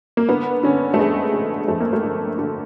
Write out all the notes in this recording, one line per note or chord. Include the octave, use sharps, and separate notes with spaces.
A#3
D3 B3
D3 C#4
A3
F2 G#3
D3
F2 A3
A#3
A3
D3
D3